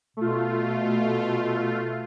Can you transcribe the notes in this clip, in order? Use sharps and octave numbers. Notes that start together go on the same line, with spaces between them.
B2 A3 F4